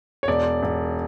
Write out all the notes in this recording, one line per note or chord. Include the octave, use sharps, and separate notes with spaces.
C#5
E1 D5
E1